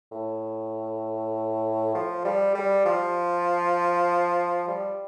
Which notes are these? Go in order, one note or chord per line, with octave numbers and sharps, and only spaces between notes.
A2
F3
G3
G3
F3
G3